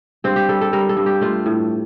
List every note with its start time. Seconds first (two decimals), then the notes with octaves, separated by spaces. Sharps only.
0.24 G2 C4
0.36 G4
0.49 G3 A4
0.61 A4
0.73 G3 A#4
0.89 A4
0.97 G2
1.06 G4
1.21 A3 F4
1.46 A2